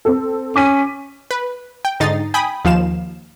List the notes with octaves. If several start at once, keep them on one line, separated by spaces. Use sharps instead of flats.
C4 A4
C#4 D6 B6 D#7
B4
G5
G#2 D3 D#4 A6 C7
G5 G#5 B5 D#6
D#2 F3 F5 E7